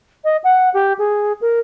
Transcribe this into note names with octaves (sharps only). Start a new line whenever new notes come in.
D#5
F#5
G4
G#4
A#4